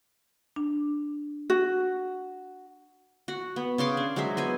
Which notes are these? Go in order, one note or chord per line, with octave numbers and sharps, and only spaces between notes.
D4
F#4
F#4 F#5
B3
C#3 C#5 C6 D6
D4
F#3 G#3 C5 E5
B3 C5 G#5